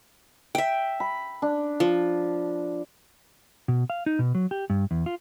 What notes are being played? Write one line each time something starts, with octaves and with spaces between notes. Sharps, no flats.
E5 G5
B5
D4
F3
B2
F5
D#4
B2
F#3
G4
G2
E2
F4